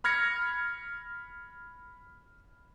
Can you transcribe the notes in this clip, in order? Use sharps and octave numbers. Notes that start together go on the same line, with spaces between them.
B5 F6 G#6 A#6 C#7